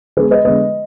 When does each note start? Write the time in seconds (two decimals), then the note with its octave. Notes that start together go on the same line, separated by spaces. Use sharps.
0.17 D3 G#3 B3 G#4 B4
0.31 B4 D#5
0.45 D3 G#3 B3 B4 D#5